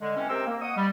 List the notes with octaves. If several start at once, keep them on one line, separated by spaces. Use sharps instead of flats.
D3 G#3
E3 G#3 C4 C#4
C3 C4 A#4 C5 G5 E6
A#3
D#5 F#5 C#6 D#6
G3